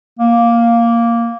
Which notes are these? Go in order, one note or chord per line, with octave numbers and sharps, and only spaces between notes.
A#3